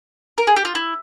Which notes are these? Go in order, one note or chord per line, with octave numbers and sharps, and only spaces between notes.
A#4
G#4
G4
F4
E4